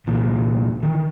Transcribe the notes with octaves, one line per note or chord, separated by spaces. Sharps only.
C2 A#2 E3
D#3 E3